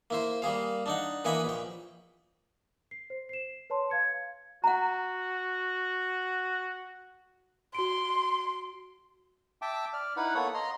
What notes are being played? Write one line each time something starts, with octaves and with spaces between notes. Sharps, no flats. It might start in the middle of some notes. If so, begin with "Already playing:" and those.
A#3 E4 C5
G3 A#3 G#4 F5
D4 D#4 F#5
E3 A#3 D#5 F#5 G#5 B5
A#1 G5
C7
C5
C7 E7
B4 C#5 A5 C6
F5 G#6 C#7
F#4 F#5 A#5
F#4 C6 D7
E5 G5 A5 D6
D5 F6
D#4 E4 B4 F#5 B5
A#3 B3 A4 C#5 B5 D#6
D#5 A#5 C6